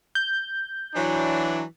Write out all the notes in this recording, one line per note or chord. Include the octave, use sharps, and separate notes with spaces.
G6
E3 F#3 D4